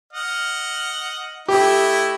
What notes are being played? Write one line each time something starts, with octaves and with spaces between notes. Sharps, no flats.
D#5 F#5 F6
A3 E4 G4 D#5